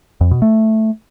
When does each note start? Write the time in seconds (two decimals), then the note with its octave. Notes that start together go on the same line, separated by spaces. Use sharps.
0.21 F2
0.31 B2
0.42 A3